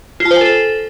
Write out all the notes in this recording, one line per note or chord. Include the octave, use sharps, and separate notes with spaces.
F4
A5
C5
G#5
A4